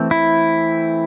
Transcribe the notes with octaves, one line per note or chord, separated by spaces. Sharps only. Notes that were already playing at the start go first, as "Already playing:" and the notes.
Already playing: E3 A3 C4
E4